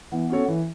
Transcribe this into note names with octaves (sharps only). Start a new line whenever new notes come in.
E3 B3
C#4 F#4 A4 C#5
E3